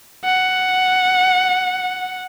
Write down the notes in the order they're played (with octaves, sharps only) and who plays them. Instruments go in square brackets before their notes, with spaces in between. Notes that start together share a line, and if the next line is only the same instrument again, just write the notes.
[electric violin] F#5